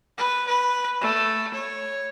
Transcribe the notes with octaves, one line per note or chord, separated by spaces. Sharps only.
B4
B4
A3
C#5